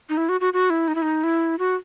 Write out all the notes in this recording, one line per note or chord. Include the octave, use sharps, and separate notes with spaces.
D#4
E4
F#4
F#4
F#4
E4
D#4
E4
D#4
E4
F#4